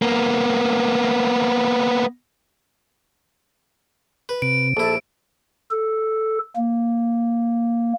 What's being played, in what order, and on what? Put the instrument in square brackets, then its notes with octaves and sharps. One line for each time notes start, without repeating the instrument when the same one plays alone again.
[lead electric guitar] A#3 B3
[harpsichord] B4
[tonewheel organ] C3 [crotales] D7
[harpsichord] A#1 E4 [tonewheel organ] A4
[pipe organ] A4
A#3